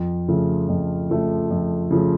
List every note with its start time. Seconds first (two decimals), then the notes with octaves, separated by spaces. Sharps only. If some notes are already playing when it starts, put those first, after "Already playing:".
Already playing: F2
0.28 C#3 F3 A3
0.69 F2
1.10 C#3 F3 A3
1.51 F2
1.91 C#3 F3 A3